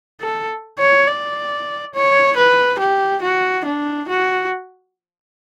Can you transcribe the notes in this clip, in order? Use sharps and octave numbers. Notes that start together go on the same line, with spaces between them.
A4
C#5
D5
C#5
B4
G4
F#4
D4
F#4